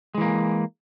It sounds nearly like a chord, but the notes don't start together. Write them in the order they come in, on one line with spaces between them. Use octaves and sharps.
G#3 E3 A#3